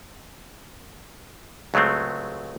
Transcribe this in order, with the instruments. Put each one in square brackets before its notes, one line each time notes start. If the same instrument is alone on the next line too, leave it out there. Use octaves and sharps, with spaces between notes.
[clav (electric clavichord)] C#2 F#3 G#3 A3 C4